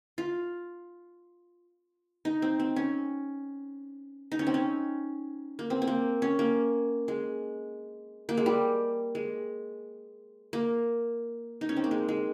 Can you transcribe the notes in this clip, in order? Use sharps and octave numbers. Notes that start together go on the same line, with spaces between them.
F4
D#4
C4
C4
C#4
D#4
C#4
C4
C#4
A#3
C4
C4
A#3
C#4
A#3
G#3
A#3
G#3
G3
G#3
A#3
D#4
C#4
C4
A#3
G#3
G#3